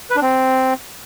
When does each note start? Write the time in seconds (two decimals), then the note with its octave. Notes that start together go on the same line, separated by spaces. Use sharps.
0.10 B4
0.16 D4
0.22 C4